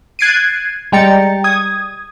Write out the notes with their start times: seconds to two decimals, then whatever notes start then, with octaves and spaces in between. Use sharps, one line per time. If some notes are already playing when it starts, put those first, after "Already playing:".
0.19 F#6 G#6 A6 C7 D7 D#7
0.92 G3 G#3 G5 A#5 A6 C#7
1.44 D#6 G#6